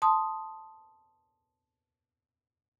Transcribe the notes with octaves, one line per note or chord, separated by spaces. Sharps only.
A5 C6 D#6